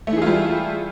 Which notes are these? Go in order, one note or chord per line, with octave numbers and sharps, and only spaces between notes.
E3 G3 A3 F4 G#4